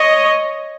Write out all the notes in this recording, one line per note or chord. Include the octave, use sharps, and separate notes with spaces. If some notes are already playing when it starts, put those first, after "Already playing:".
Already playing: C#5 D#5